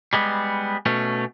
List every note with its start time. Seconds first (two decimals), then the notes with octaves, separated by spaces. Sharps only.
0.13 G3 G#3 B3
0.86 B2 A3 C#4